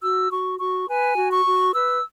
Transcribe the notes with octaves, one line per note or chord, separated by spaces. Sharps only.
F#4 E6
F#4 C#6
F#4 C#6
B4 G#5
F#4
C#6
F#4
B4 E6